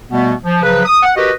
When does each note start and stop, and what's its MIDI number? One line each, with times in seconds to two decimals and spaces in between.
0.10 0.32 47
0.10 0.32 55
0.10 0.32 57
0.10 0.32 59
0.43 0.61 53
0.63 0.83 49
0.63 0.83 53
0.63 0.83 54
0.63 0.83 71
0.85 1.00 87
1.03 1.11 78
1.16 1.31 66
1.16 1.31 67
1.16 1.31 70
1.16 1.31 71
1.16 1.31 75